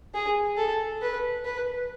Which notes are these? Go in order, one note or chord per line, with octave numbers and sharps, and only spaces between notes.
G#4
A4
B4
B4